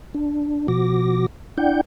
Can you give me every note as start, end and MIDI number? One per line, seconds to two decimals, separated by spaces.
0.15 0.67 62
0.68 1.26 47
0.68 1.26 53
0.68 1.26 66
0.68 1.26 86
0.68 1.26 94
1.58 1.81 62
1.58 1.81 64
1.58 1.81 74
1.58 1.81 78
1.58 1.81 79
1.58 1.81 91